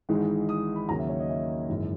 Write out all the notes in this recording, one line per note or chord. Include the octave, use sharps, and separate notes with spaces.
G#1 G#2 E3 G#3
D#6
B5
D#2 C#3 F#3 A#3 A#5
E5
C#5
D#5
E5
G#1 F#2 C#3 E3